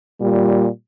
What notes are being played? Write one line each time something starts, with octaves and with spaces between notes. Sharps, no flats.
A#2 G3